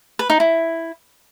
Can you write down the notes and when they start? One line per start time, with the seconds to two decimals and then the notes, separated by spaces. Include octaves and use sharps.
0.19 B4
0.30 D#4
0.40 E4